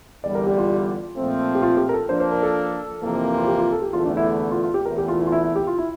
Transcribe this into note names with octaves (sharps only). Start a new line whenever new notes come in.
E2 D3 G3 D5
A#4
G4
F4
A#2 F3 A3 C4
G4
F4
G4
A#4
A4
F3 A#3 D4 C5
C5
A#4
A4
F2 C3 E3 A#3
F4
G4
F4
A4
G4
E2 D3 A3 F4
D4
E4
E4
F4
F4
G4
E2 E3 A3 A#4
G4
F4
E4
F4
E4
E4
G4
F4
E4